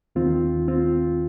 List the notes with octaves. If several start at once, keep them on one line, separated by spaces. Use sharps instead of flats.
D#2 D#3 C4 F4
C4 F4